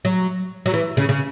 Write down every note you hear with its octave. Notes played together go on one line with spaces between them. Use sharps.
F#3
F#3
E3
C#3
C#3